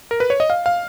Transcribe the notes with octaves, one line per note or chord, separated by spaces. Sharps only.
A#4
B4
C#5
D#5
F5
F5